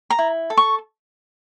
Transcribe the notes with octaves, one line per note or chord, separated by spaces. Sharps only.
A#5
E4
A4
C#6